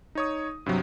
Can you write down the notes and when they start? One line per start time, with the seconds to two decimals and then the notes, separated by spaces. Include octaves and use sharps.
0.15 D#4 C#5 D#6
0.66 G2 C3 F#3